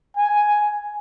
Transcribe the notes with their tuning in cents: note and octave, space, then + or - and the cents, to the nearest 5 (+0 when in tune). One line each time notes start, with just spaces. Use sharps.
G#5 +5